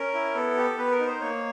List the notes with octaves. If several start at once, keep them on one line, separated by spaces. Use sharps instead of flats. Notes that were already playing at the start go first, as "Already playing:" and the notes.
Already playing: C#4 A#4
E4
B3 A4
G4
B3 B4
A#4
D#4
C5
A#3 C#5